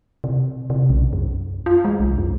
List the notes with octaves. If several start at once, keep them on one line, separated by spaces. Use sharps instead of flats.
C3
C3
B1
F#2
F4
G#3
C2
F#2